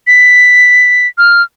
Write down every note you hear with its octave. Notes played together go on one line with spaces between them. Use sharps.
B6
F6